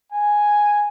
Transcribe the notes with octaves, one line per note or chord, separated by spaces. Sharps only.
G#5